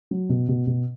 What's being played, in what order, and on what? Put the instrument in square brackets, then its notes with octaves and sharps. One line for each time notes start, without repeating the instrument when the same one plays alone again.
[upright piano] F#3
B2
B2
B2